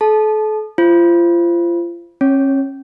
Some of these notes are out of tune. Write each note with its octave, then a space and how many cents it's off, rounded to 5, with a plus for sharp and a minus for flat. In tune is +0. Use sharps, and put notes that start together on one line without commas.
A4 -40 A5 -25
F4 -30 C5 +0
C#4 -35 C#5 +0